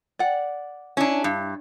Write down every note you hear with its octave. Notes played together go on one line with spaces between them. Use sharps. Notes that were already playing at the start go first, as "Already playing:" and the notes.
D5 F#5
C#4 D4 E4
G2